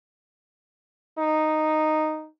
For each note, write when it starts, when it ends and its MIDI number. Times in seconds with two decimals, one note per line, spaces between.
1.18 2.27 63